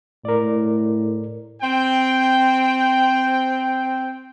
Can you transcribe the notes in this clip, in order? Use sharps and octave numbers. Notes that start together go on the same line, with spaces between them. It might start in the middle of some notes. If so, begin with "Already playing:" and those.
A2 A#4 D5
C4 G5